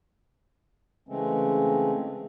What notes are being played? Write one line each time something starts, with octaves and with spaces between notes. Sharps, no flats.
C#3 E3 G#3 A3 C4 C#4